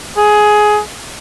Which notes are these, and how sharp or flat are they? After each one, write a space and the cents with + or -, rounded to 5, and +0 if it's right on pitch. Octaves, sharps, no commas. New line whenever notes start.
G#4 +15